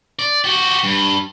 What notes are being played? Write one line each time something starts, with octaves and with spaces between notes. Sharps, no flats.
D5
F#4 G4
G2